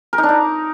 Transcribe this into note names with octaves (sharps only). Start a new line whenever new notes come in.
A#4
D#4
D4
D#4